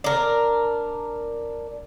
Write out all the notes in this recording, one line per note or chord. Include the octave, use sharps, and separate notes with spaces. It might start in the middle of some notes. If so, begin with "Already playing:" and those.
D4 A#4